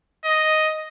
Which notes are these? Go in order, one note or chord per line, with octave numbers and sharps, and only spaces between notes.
D#5